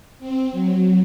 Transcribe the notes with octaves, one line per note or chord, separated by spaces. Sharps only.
C4
F#3